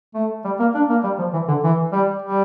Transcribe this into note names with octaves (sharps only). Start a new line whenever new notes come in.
A3
G3
A#3
D4
A#3
G3
F3
E3
D3
E3
G3
G3